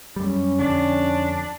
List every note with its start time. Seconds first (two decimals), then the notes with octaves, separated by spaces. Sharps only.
0.16 F#2 G3 C#4
0.59 F2 D3 D4